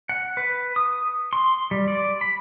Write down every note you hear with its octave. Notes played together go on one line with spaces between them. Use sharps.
F#5
B4
D#6
C6
G3
D5
B5